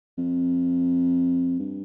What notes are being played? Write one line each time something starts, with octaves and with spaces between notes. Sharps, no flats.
F2
G2